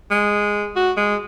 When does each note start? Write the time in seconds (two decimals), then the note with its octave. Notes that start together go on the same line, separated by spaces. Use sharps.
0.10 G#3
0.76 F#4
0.97 G#3